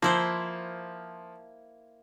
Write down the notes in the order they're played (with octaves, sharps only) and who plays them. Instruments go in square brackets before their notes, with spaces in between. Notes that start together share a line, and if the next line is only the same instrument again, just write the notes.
[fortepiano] F3 [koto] A#3 E4 C5